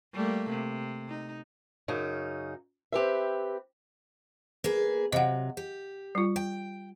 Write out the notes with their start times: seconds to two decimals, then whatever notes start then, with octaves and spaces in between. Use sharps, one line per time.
0.13 G3 A3 A#3
0.50 C3
1.08 D#4
1.88 F#2 C#3 D#4
2.92 C4 G4 B4 E5
4.64 A#3 G#4 B4
5.12 C3 F#3 D#5 F5 F#5
5.57 G4
6.15 G3 F4
6.36 G5